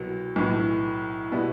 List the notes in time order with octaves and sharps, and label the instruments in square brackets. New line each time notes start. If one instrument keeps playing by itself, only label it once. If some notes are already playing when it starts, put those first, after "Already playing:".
Already playing: [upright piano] C2 B2 F#3
B1 A2 E3
B2 G3 B3 E4